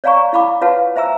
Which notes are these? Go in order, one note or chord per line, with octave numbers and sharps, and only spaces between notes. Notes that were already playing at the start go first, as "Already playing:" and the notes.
C#5 D5 F5 G#5 A#5 C#6
E4 F5 B5 D6
F4 B4 C#5 F5 F#5 A5
C5 E5 G#5 A#5 E6